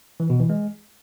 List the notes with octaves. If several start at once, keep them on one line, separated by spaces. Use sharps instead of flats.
E3
B2
E3
G#3